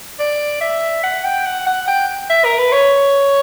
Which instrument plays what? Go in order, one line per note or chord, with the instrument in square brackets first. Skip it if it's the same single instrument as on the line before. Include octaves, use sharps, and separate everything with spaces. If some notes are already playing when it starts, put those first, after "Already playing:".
[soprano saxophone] D5
E5
F#5
G5
F#5
F#5
G5
E5
A#4
B4
C#5